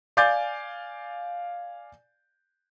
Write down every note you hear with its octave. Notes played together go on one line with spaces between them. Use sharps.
D5 F5 G#5 D6 G6 A6